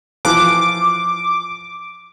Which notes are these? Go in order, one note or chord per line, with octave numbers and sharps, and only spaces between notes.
E3 F3 D6 F#6